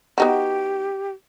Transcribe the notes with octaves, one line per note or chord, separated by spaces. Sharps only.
B3 D#4 F#4 G4